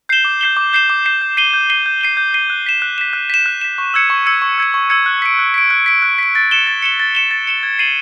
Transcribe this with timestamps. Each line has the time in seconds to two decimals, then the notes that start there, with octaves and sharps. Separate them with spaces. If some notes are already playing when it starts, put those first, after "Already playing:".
0.09 G6 C7 E7 G7
0.25 D6
0.41 G6 C7 E7 G7
0.57 D6
0.73 G6 C7 E7 G7
0.90 D6
1.06 G6 C7 E7 G7
1.22 G6
1.37 C7 D#7 G7
1.54 G6
1.70 C7 D#7 G7
1.86 G6
2.01 C7 D#7 G7
2.17 G6
2.34 C7 D#7 G7
2.50 F#6
2.66 B6 E7
2.82 F#6
2.98 B6 E7
3.13 F#6
3.30 B6 E7
3.46 F#6
3.61 B6 E7
3.78 C#6
3.94 E6 G#6 C#7
4.10 C#6
4.26 E6 G#6 C#7
4.42 C#6
4.58 E6 G#6 C#7
4.74 C#6
4.90 E6 G#6 C#7
5.06 F#6
5.22 B6 D7
5.39 F#6
5.54 B6 D7
5.70 F#6
5.86 B6 D7
6.02 F#6
6.18 B6 D7
6.35 A6
6.51 C#7 E7 G7
6.67 A6
6.82 C#7 E7 G7
7.00 A6
7.15 C#7 E7 G7
7.31 A6
7.47 C#7 E7 G7
7.63 G#6
7.79 C7 D#7 F#7